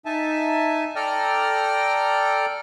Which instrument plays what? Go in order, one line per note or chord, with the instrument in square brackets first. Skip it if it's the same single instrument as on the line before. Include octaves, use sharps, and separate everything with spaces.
[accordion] D#4 E5 G#5 A5
A4 D5 G5 A#5 F6